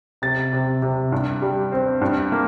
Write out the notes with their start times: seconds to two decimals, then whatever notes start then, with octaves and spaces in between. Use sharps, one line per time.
0.22 C3 A6
0.53 C3
0.82 C3
1.12 G2
1.42 G3
1.72 C4
2.01 G2
2.32 A#3